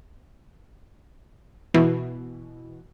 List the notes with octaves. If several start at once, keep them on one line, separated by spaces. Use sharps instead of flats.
B2 E3